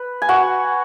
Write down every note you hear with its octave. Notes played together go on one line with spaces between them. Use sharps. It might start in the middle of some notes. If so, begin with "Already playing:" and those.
Already playing: B4
G#5
F#4 F#5